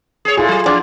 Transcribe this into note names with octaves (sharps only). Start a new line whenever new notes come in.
G#4 C#5
A#2 E4 F4 G#4 A4
F#3
F3 D4 F4 F#5